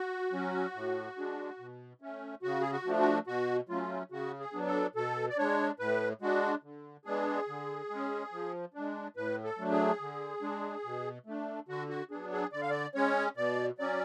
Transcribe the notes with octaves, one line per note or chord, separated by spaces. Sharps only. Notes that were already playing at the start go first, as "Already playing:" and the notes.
Already playing: F#4
F#3 C#4
A2
G#3 D4
B2
A3 C#4
C#3 F#4
G#4
F#4
F3 A3 D4
F#4
B2 F#4
F#3 A3 C#4 F4
C#3 F#4
G#4
F#3 B3 D4
A4
B2 A4
D5
G#3 D4 C#5
A2 B4
G#3 D4 F#4
D3
G#3 B3 D4 G#4
D3
G#3 C#4
F3
G#3 D4
A2 B4
A4
F#3 A3 D4
G#4
D3
G#3 D4
B2
A3 D4
D3 F#4
F#4
F#3 B3 D4 G#4
G#4
D3 D5
F5
D5
G#3 C#4 C#5
B2 D5
F#3 C#4 D5